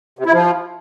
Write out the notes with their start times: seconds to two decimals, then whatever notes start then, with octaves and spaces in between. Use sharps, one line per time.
0.19 C3
0.26 E4
0.33 F3